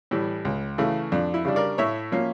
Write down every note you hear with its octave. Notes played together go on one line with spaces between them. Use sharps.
A2 E3 G3
C#2
C#3 E3 A3
F2 D4
E4
C#3 G3 D4
A#4 D5
A2 C#5 E5
F3 A#3 C#4